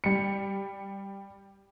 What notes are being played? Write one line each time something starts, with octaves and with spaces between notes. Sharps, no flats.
G3 C#7